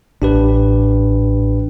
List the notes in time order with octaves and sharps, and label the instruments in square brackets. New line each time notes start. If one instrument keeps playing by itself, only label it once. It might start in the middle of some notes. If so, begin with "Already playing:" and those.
[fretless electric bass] A1 [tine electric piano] D4 G4 B4